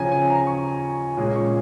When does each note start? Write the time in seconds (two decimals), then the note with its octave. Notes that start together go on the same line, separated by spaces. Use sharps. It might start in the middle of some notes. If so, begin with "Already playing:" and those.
Already playing: C#3 F3 C#4 G#5 A#5
0.12 G#5
0.30 A#5
0.47 C#6
1.17 A#2 G#3 C#4
1.36 C#6